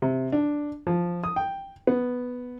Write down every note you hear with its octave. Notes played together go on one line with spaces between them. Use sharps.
C3
D4
F3
D#6
G5
B3